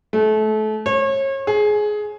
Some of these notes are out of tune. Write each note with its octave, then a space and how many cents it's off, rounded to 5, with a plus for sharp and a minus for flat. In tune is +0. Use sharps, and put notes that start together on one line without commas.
A3 -30
C#5 -35
G#4 +15